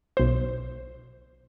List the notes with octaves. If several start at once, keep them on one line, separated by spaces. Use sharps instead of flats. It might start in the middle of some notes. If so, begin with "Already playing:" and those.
B1 C5